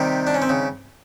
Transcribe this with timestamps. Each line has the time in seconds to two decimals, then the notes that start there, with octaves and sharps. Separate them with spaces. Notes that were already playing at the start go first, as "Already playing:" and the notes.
Already playing: C3 D#3 G3
0.27 D4
0.34 C#4
0.42 C4
0.49 C#3